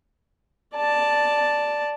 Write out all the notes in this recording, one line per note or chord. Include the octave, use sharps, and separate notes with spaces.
D5 A5